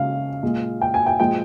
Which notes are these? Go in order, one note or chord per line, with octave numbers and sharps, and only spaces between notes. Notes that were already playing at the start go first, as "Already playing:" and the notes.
Already playing: C#3 G#3 F5
A#2 G#3
G5
G#5
G5
A#2 F3 G#3 G5